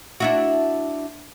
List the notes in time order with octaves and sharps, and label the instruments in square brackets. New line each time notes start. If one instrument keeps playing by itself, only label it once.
[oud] D4 E4 F#4